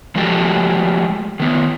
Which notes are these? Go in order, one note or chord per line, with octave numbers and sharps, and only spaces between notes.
F3 G#3 A3 F#4 G4 A4
D#3 B3